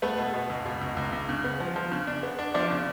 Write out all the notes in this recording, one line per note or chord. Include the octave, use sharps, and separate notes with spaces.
A3 B3 B4
B2
B2
C#2
B2
C#2
C#2
C#2
C#3
B3
F3
F3
C#3
D4
B3
D4
F3 D4 D5
C#3